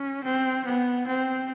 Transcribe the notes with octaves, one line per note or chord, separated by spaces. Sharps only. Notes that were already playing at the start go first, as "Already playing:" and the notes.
Already playing: C#4
C4
B3
C4